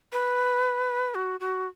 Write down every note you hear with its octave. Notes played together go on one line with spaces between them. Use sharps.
B4
F#4
F#4